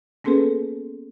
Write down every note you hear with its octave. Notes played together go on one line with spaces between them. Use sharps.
A#3 B3 C#4 G#4 A4 B4